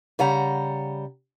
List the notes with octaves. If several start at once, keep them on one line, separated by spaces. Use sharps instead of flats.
C#3 G3 F#5 A#5